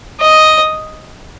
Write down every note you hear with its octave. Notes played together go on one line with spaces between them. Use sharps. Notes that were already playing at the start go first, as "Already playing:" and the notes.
D#5